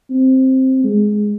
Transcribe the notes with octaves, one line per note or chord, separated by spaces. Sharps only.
C4
G#3